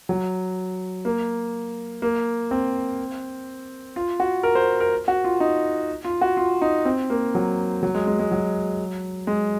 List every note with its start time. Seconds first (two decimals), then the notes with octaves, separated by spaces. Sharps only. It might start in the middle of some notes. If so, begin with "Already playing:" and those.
0.09 F#3
1.05 A#3
2.02 A#3
2.51 C4
3.96 F4
4.20 F#4
4.43 A#4
4.55 C5
4.80 A#4
5.08 F#4
5.24 F4
5.40 D#4
6.05 F4
6.21 F#4
6.37 F4
6.62 D#4
6.85 C4
7.10 A#3
7.35 F#3
7.83 F#3
7.95 G#3
8.07 G#3
8.19 G#3
8.31 F#3
9.27 G#3